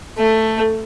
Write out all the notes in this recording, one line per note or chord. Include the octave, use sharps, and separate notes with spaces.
A3